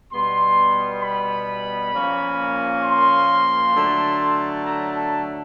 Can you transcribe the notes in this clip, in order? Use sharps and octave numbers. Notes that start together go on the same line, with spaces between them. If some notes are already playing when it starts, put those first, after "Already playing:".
B2 G3 B3 C6
B5
A#2 F3 A#3 C#4
C6
D3 F#3 A3
A#5
A5